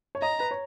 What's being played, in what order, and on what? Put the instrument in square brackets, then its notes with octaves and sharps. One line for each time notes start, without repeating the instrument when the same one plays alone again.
[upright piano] C#5
[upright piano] D#5 [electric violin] A#5
[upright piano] B4
C#5